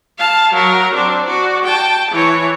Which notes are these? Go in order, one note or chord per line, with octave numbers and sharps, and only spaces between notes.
F5 A5
F#3 A#4
C4 D4
F#4 D5
G5 A5
E3 C#5